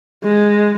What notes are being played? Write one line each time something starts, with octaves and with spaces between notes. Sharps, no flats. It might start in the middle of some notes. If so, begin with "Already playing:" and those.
G#3